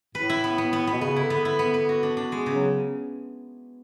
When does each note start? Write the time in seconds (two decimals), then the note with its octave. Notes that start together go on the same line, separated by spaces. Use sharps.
0.15 A2 B4
0.30 E4
0.44 B3
0.58 B3
0.73 B3
0.87 B3
0.93 B2
1.01 C#3 B3
1.16 E4
1.23 D3
1.30 B3
1.45 E4
1.59 B3
1.74 B3
1.89 F#4
2.03 D4
2.17 D4
2.32 G#3
2.46 C#3
2.54 F#3